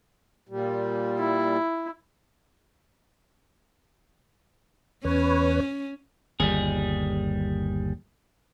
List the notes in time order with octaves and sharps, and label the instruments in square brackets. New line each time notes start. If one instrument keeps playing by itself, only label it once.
[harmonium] A#2 G3
[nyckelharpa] E4
[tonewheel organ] E2 B4 C#5 [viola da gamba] C#4
[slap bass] G1 D#2 [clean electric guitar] G3 G#4